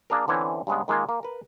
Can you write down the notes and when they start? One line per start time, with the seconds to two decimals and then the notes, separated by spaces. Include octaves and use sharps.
0.10 A#3 D4 G#4 A#4
0.28 D3 E3 C4 C#4 E4
0.67 G2 C#3 G#3 B3
0.88 D#3 G#3 A#3 F4 G#5
1.09 A#3
1.23 A#4 B4